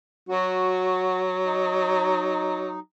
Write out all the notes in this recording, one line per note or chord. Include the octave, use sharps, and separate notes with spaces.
F#3 F#4
D#4